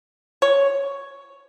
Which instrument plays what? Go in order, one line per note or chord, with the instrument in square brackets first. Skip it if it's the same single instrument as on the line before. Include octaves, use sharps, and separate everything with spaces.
[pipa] C#5